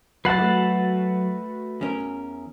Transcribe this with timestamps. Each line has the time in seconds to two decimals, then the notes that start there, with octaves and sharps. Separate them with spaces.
0.25 F#3 B4 F#5 A5 A6 C7
0.39 A3 F#4
1.81 E2 C#4 A#4